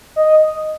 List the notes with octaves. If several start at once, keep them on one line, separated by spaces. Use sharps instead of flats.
D#5